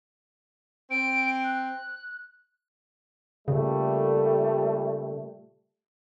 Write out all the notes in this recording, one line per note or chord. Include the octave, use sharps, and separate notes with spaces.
C4 D7
F#6
A#2 C#3 G3 A3